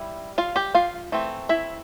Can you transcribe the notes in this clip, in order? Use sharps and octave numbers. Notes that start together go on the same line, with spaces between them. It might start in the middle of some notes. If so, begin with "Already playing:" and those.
Already playing: G3 E4
F4 F5
G4 G5
F4 F5
E3 A3 C4
E4 E5